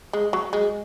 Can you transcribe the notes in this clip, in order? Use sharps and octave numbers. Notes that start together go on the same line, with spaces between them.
G#3
F#3
G#3